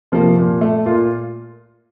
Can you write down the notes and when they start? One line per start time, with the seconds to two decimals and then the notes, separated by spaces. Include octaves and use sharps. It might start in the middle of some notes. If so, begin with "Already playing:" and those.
0.12 C3 F3 A#3
0.37 A#2
0.61 A3
0.86 A#2 F4